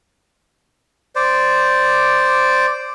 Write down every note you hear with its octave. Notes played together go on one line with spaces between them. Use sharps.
C5 D5